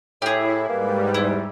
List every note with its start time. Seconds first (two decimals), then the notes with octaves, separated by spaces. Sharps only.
0.22 A2 E4 G4 G#4 C#5
0.69 G#2 G3 A#3 B4
1.14 E2 E4